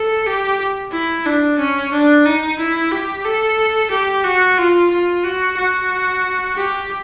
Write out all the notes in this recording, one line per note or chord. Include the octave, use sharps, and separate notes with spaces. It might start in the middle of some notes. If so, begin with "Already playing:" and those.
Already playing: A4
G4
E4
D4
C#4
D4
D#4
E4
G4
A4
G4
F#4
F4
F4
F#4
F#4
G4